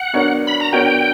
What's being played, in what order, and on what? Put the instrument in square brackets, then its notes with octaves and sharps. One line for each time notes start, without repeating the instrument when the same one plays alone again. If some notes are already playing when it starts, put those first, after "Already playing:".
Already playing: [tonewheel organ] F#5
[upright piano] B3 D4 F#4 A#4 C#5
[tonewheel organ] B5
A#5
[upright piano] B3 D4 F#4 A#4 C#5 [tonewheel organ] G5